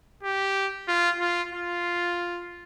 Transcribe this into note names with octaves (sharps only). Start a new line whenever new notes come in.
G4
F4
F4
F4